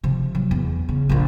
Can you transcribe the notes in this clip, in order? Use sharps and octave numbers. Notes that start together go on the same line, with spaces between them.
C3 F3
F#3
E2
C#3
A#1 A#2